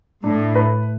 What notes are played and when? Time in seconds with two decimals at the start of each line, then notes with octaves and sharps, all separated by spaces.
0.24 A2 D4
0.55 B4